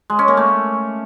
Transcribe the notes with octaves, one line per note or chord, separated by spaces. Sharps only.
G#3
C#4
A#3
A3